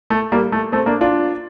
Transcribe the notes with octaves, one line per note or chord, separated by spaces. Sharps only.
A3
G3 A#3
A3
A3 C4
A#3 D4
D4 F4